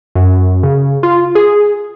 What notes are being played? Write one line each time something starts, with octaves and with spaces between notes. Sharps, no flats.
F#2
C#3
F4
G#4